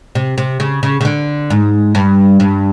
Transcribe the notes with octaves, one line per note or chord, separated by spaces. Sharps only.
C3
C3
C#3
C#3
C#3
D3
G#2
G2
G2